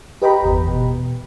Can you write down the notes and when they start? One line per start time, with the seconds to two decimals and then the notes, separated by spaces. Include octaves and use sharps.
0.22 G4 B4 D#5 G5 A#5 B5
0.42 G1 E2
0.68 B2